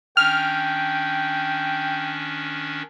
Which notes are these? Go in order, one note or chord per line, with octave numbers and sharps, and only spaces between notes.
D#3 C#4 D4 G5 F6